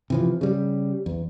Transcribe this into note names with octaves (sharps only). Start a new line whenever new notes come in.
C3 E3 F3
C#3 G3
E2